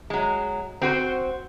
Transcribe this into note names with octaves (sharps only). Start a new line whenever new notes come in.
F#3 G#3
C4 F#4 C5